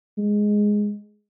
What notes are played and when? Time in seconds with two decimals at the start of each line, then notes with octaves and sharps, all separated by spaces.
0.18 G#3